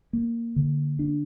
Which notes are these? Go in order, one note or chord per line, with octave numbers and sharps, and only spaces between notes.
A#3
D3
D4